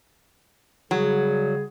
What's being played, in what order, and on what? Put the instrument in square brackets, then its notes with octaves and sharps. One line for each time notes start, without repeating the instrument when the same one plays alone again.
[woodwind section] C#3 G3 G#4 [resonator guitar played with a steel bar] F#3